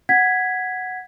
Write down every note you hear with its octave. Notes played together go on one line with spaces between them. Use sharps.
F#5 G#6 B6